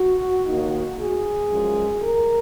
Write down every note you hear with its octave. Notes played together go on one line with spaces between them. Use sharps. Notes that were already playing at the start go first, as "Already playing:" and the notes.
Already playing: F#4
D#2 D#3 A#3 D#4
G#4
F#2 F3 G#3
A#4